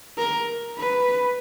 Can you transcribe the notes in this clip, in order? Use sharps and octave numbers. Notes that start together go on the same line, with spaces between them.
A#4
B4